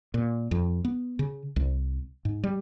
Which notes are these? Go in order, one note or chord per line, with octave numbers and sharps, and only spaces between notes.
A#2
F2
B3
C#3
C2
G#2
G3